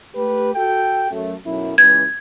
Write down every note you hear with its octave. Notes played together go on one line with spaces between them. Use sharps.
A3 G4 B4
F#4 A4 G5
F#2 A3
B1 F#2 E4
C#2 E3 G#6